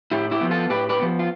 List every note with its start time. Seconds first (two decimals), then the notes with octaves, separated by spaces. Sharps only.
0.11 A2 E4 G4
0.31 E4 G4
0.41 F3 B3
0.51 F4 A4
0.70 A2 G4 B4
0.89 G4 B4
1.00 F3 B3
1.19 F4